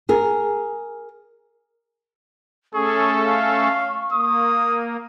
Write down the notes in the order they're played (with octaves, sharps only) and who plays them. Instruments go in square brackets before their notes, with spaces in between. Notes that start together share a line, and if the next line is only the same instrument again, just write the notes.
[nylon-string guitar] G#4 A#4
[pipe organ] A3 C#4 A4 [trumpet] G#4 [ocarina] C#6
[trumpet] F5
[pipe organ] A#3 [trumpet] D#6